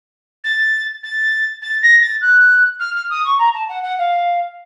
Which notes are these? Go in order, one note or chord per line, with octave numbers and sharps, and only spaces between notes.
A6
A6
A6
A#6
A6
F#6
F6
F6
D#6
C#6
A#5
A5
F#5
F#5
F5